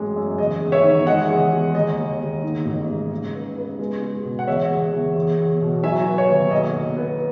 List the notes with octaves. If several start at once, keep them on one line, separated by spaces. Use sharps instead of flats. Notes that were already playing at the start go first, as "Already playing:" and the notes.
Already playing: A1 F#2 G#3
F#2
E2 D#5
E2
C#5 E5
D#3
G#3 D#5 F#5
E2
G#3
D#2 D#5
D#2
D#2
D#3
A1
G#2
C#3
B3
B3
G#3
G#3
B2
F#5
E2 C#5 E5
E2
E2
E2
E2
B2
F#3 E5 G#5
B3
C#5
D#2
B1 D#5
B2
B3